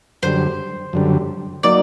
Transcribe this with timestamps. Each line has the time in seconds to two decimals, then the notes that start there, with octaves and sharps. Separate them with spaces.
0.23 F#2 D3 G3 C5
0.93 F#2 D3 G3
1.63 F#3 A#3 D#4 D5